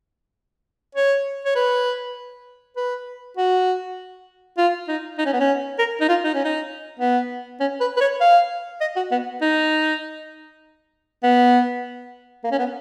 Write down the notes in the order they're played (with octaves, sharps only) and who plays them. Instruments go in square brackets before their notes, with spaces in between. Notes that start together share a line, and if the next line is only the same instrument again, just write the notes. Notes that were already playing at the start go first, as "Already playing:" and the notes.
[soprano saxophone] C#5
C#5
B4
B4
F#4
F4
D#4
D#4
C#4
B3
C#4
A#4
D#4
F4
D#4
C#4
D#4
B3
C#4
B4
B4
C#5
F5
D#5
F#4
B3
D#4
B3
A#3
C#4
B3